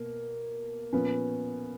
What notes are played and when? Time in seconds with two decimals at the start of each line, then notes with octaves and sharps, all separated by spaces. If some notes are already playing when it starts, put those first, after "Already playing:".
Already playing: B2 A#3
0.93 A#2 F3 B3 C#4